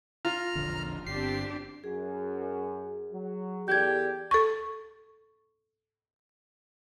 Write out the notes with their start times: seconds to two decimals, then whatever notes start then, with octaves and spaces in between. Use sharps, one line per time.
0.25 F4 A#5 F6
0.55 E1 A#1 D3
1.07 G1 C4 D4 G4 C7
1.84 F#2 G#4
3.12 F#3
3.68 E2 G4 A4 D5 G6 G#6
4.31 A4 C#6